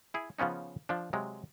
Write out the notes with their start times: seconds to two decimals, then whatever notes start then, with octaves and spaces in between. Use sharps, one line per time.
0.14 E4 G#4
0.39 C#3 F3 B3 C#4 D#4
0.89 F3 D4
1.13 C3 F#3 G#3